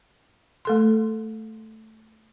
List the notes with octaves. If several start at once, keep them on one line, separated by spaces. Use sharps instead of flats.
A3 A4 C6